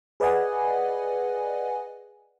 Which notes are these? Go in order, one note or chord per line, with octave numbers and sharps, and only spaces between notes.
G#4 B4 D5 D#5 F#5 G#5